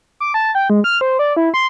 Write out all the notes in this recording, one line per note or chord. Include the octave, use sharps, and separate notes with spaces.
D6
A5
G5
G#3
F6
C5
D5
E4
C6